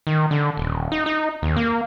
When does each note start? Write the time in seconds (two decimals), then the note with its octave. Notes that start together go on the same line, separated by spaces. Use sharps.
0.07 D#3
0.31 D3
0.57 D#1
0.92 D#4
1.06 D#4
1.42 D#2
1.56 A#3